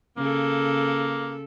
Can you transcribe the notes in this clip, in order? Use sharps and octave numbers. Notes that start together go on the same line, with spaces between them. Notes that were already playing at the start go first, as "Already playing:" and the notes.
C#3 A#3 A4